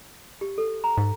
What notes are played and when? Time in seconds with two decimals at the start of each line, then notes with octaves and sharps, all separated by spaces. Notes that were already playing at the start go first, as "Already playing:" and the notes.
0.41 G4
0.58 A4
0.84 A#5
0.98 G#2